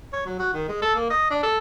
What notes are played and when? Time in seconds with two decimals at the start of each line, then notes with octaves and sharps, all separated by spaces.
0.13 C#5
0.26 F#3
0.39 F#4
0.54 D#3
0.68 G#3
0.82 A4
0.95 A#3
1.10 D#5
1.31 D4
1.43 A4